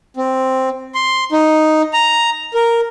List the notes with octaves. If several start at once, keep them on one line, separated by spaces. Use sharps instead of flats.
C4
C6
D#4
A#5
A#4